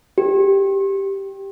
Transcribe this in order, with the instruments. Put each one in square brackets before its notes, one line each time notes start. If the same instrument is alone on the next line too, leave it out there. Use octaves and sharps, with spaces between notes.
[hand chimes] G4